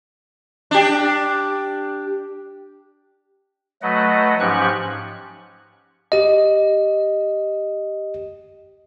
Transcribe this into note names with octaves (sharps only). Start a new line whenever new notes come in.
D4 G4
F#3 A3 B4 D#5 F#5
G#2 F3 C#4 G4 C#6 F#6
G4 D#5